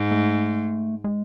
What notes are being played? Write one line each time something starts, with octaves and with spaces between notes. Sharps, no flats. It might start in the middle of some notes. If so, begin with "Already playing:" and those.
Already playing: G#2
A3
G#3